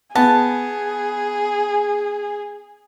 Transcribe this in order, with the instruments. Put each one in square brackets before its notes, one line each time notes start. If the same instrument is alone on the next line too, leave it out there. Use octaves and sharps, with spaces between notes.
[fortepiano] B3 [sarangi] G#4 [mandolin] A5